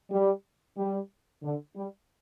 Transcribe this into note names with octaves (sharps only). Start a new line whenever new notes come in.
G3
G3
D3
G3